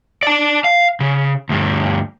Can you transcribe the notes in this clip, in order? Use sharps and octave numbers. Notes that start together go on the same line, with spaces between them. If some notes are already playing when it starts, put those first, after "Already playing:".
D5 A5
F5
C#3
D2 G2